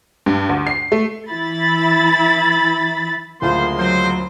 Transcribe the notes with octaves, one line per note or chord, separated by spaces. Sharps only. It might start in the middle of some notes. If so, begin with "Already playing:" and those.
G2
D2
C7
A3
E3 E4 B5 A6
F#1 D2 G#3 A#3 F4 C5 C6
F#3 C5